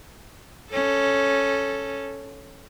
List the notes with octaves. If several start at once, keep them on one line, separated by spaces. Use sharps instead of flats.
C#4 A4